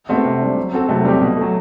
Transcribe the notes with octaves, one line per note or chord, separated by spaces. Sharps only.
A3 B3 C4 F#4
C3
G3 D4
F#3
C4 F#4 A4
C3 F#3 A3
G3 C4 G4
B2
F#3 A3